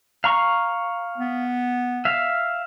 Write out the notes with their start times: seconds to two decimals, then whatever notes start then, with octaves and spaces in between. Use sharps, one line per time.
0.24 F5 A#5 C#6
1.18 B3
2.05 E5 F5